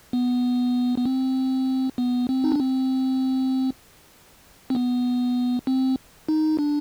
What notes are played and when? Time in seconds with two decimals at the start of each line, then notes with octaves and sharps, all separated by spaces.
0.13 B3
0.98 B3
1.06 C4
1.98 B3
2.29 C4
2.44 D#4
2.52 D4
2.59 C4
4.70 C4
4.75 B3
5.67 C4
6.28 D#4
6.59 D4